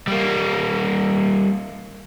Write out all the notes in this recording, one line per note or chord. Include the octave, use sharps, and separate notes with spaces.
G3 A#3